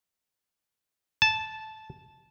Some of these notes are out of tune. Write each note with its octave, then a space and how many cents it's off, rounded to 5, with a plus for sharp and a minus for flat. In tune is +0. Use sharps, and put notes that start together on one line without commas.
A5 -10